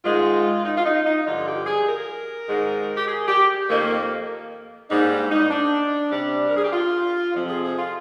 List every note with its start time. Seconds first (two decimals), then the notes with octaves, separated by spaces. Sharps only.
0.05 G#2 D#3 G#3 F4
0.65 D#4
0.77 F4
0.85 D#4
1.06 D#4
1.26 G2 D3 F3 F4
1.46 G4
1.66 G#4
1.87 A#4
2.48 G#2 D#3 G#3
2.97 G4
3.08 G#4
3.28 G4
3.69 F2 D#3 A#3
4.90 G#2 G3 A#3 D#4
5.11 D4
5.31 D#4
5.50 D4
6.11 C3 G3 D4
6.48 A#4
6.56 G#4
6.64 G4
6.73 F4
7.34 F2 C3 F3 C4
7.49 G#4
7.64 G#4
7.79 F4